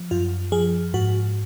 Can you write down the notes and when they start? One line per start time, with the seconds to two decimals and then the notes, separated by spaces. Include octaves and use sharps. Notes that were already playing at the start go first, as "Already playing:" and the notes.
Already playing: F3
0.11 F#2 F4
0.52 F3 G#4
0.94 G#2 F#4